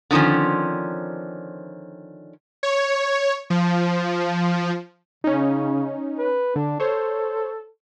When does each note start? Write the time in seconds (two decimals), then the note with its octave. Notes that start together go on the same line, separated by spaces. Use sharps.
0.11 D3 D#3 F3 C4 C#4
2.63 C#5
3.50 F3
5.24 C#3 C#4 D#4
6.19 B4
6.56 D3 D4
6.80 A4 C5 C#5